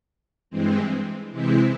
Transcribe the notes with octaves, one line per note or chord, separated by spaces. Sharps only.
G2 E3 G#3 C4
C3 E3 G#3 C4 E4